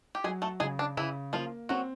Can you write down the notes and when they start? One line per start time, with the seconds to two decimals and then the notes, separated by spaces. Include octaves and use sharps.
0.15 G4
0.24 F#3 G#3 G#4
0.42 A3 A4
0.60 C#3 G#3 G#4
0.79 D4
0.97 C#3 E3 E4
1.33 F3 A#3 F4
1.69 F#3 C4 F#4